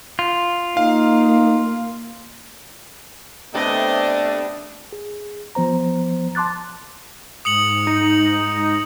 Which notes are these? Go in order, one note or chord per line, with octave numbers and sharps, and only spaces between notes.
F4
A#3 D#4 F5
C3 A3 B3 D4 D#5 G#5
G#4
F3 B3 C5 A#5
A5 C6 D6 F#6 A6
G#2 D#6 C#7 F#7
D#4